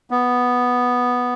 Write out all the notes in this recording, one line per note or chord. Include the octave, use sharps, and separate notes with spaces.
B3